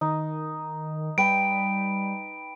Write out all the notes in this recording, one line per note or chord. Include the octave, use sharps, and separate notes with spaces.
D#3 D#4
G3 B4 G5 D7